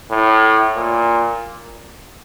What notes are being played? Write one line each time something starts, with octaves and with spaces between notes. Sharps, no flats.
A2
A#2